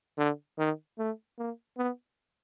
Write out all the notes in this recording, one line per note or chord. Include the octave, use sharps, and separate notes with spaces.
D3
D#3
A3
A#3
B3